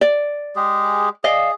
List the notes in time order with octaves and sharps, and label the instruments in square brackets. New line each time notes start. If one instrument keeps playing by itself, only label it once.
[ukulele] D5
[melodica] G#3 G4 G#4
[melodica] G#4 [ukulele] D5 D#5 F5